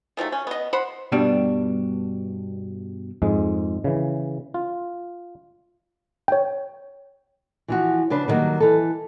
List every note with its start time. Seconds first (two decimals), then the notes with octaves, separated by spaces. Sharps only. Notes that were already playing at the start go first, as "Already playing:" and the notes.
0.17 D#3 F3 F#3 A3
0.32 C#4
0.47 B3 D#5
0.73 C5 F#5 B5
1.12 G2 B2 G3 D4
3.22 F2 G#2 G#3
3.84 C#3 E3
4.54 F4
6.28 C#5 G5
7.68 E3 F3 F#4
8.10 C#3 D4 B4 C5
8.28 D3 D#3 F#3 G3 A#3
8.60 E3 A4